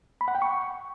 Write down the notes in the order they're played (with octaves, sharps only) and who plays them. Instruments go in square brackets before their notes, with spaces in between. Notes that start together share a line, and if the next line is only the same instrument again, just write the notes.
[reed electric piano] B5
F#5
G5
C#6